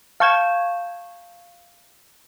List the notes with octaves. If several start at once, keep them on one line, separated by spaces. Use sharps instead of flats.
F5 A5 C#6 G6 G#6 E7